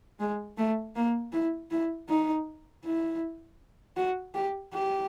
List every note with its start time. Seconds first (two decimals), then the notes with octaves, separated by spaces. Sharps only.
0.19 G#3
0.58 A3
0.95 A#3
1.32 E4
1.71 E4
2.09 D#4
2.84 E4
3.96 F#4
4.34 G4
4.73 G4